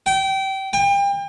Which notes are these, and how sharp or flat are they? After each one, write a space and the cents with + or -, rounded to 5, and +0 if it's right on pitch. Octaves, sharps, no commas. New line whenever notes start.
G5 -25
G5 +35